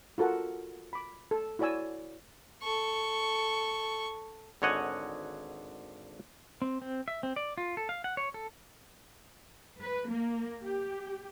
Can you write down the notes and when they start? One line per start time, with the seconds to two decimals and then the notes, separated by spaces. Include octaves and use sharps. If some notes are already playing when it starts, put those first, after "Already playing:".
0.18 F4 F#4 A4 A#4 F#5
0.93 B5 D6
1.31 A4
1.59 E4 F#4 C#5 D5 G#5 E6
2.63 A4 C#6
4.62 G#1 D3 C#5 D#5 F#5 G#5
6.62 C4
6.82 C4
7.08 E5
7.23 C4
7.36 D5
7.58 F4
7.77 A4
7.89 F5
8.04 F#5
8.17 C#5
8.34 A4
9.82 B4
10.11 A#3
10.64 G4